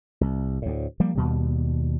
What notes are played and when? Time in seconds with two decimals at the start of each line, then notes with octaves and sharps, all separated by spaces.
0.21 C2
0.62 D2 A2
1.00 F3 G3 A#3
1.15 D#2 B2 G3